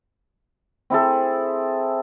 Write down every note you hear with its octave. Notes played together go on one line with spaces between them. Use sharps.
C4 E4 G#4 A4